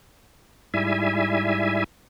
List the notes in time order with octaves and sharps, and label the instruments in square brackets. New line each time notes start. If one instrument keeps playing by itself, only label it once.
[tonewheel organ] G#2 G3 E4 E5 G#5